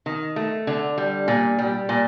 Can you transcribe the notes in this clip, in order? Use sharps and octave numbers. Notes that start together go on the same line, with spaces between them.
D#3
A3
D3
G3
A#2
G3
A#2